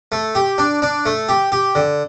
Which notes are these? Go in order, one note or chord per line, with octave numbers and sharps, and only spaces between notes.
A3
G4
D4
D4
A3
G4
G4
D3